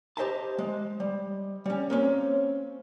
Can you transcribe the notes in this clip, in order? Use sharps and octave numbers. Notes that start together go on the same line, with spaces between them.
G4 C5 D#5 E5 G#5 A5
G#3
G3
G3 C#4
A#3 C4 C#4